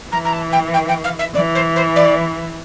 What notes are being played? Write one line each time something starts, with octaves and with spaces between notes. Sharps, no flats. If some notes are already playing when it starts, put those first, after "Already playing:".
E3 A#5
A#5
A5
G5
G5
G5
F5
E5
E3 D5
C5
C5
D5